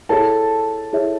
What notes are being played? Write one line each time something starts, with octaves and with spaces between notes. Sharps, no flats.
E4 G#4 A4 C#5 E5 A5
E4 G#4 C#5 E5